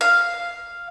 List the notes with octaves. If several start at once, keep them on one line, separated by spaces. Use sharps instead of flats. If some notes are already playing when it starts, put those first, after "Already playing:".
F5